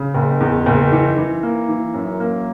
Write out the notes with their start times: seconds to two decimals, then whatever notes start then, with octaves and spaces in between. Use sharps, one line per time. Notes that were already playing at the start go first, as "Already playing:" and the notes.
Already playing: C#3
0.15 F#1
0.40 E2
0.66 F#1
0.92 E3
1.17 E3
1.43 A#3
1.69 E3
1.94 F#2
2.20 A#3